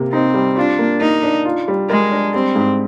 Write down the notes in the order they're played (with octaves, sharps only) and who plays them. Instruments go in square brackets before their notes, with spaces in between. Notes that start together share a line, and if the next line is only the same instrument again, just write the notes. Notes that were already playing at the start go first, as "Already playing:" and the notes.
Already playing: [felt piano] C3 A#3
[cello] C4 [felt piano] D#4
[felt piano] G3
[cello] D4 [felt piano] F4
[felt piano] A#3
[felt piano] A#3 [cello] D#4
[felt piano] D4
F4
G3
[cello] G#3 [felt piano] A#4
[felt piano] D4
[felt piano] G3 [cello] C4
[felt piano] G#2